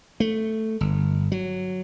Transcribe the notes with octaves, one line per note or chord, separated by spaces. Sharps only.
A3
G1
F#3